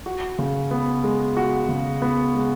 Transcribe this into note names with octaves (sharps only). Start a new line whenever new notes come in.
F#4
C#3
B3
G#3
F#4
C#3
B3
G#3